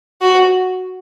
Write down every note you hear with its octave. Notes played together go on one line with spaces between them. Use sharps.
F#4